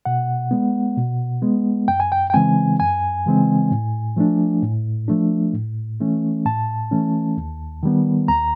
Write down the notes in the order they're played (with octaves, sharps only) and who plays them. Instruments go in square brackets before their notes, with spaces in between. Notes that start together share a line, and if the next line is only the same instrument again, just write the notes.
[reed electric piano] B2 F#5
G#3 B3
B2
G#3 B3
F#2 G5
G#5
G5
G5
C#3 E3 G#3 C4 G#5
F#2 G#5
C#3 E3 G#3 C4
A2
F3 A3 D4
A2
F3 A3 D4
A2
E3 A3 C#4
A2 A5
E3 A3 C#4
D#2
D#3 G3 B3
D#2 A#5